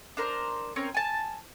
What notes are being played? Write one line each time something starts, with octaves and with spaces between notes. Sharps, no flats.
D4 A#4 C5
C4 C#4 A#4 C#5
G#5 A5